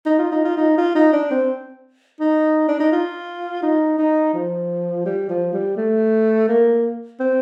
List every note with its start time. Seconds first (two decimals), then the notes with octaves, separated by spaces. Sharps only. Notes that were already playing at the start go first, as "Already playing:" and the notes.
0.06 D#4
0.18 F4
0.32 D#4
0.44 F4
0.57 D#4
0.77 F4
0.95 D#4
1.12 D4
1.31 C4
2.20 D#4
2.68 D4
2.80 D#4
2.92 F4
3.62 D#4
3.98 D#4
4.34 F3
5.05 G3
5.29 F3
5.53 G3
5.77 A3
6.48 A#3
7.20 C4